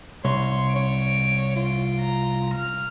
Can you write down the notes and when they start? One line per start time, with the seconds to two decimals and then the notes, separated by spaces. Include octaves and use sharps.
0.25 C2 C#5 C6
0.76 C#5 D7
1.56 F4
2.00 A#5
2.54 F6